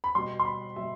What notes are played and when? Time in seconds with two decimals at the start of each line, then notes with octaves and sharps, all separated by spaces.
0.04 B5
0.15 B2 G3 C6
0.39 C6
0.45 B5
0.76 B2 G3 E5